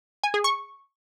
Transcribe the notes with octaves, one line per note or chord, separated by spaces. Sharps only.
G#5
G#4
C#6